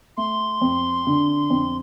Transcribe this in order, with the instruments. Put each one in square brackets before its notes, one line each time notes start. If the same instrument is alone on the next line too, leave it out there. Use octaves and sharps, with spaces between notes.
[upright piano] A3 [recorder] C6
[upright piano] F2
D3
F2